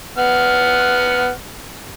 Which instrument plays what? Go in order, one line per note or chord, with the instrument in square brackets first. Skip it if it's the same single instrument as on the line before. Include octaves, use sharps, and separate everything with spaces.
[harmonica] B3 F#5 F6